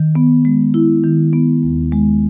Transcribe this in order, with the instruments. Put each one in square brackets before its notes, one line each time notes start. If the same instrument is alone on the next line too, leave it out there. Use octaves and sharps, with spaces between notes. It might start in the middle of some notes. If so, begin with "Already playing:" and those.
Already playing: [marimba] D#3
B3
G#3
E4
D#3
B3
D#2
G#3